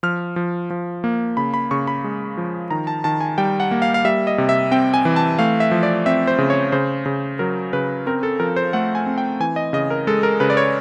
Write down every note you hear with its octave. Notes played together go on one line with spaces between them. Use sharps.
F3 F6
F3
F3
A#3
C#3 B5
B5
C#3 C#6
B5
G#3
F3
D#3 A#5
A5
D#3 A5
G#5
G3 G5
F#5
A#3
F5
F5
G3 E5
D#5
C3
E5
C4 G5
G#5
E3
A5
A3 F5
E5
F3
D5
C4 E5
C5
C#3
C#5
C#3 C5
C#3
F#3 A#4
C#3 B4
C4 A#4
A4
F3 A#4
C5
A3 F#5
G#5
C4
G5
E3 G#5
D#5
C#3 D#5
A#4
G#3 A4
A#4
C#3 B4
D5
C#5